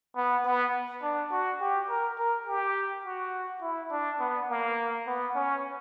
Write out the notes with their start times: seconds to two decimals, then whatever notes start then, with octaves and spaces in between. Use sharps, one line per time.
0.16 B3
0.45 B3
1.02 D4
1.32 F#4
1.61 G4
1.90 A#4
2.19 A#4
2.47 G4
3.05 F#4
3.62 E4
3.92 D4
4.20 B3
4.49 A#3
5.07 B3
5.36 C#4